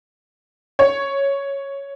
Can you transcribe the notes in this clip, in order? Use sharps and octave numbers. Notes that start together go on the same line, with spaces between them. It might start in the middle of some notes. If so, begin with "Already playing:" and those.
C#5